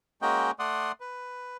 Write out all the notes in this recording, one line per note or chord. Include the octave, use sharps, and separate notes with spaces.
G#3 A#3 C#4 F#4 D#5 G5
A3 D5 F#5 C6 D#6
B4